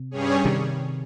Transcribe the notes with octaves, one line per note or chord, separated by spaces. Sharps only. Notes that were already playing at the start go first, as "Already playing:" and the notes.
Already playing: C3
G2 G3 C#4 G#4 C#5
C3 D#3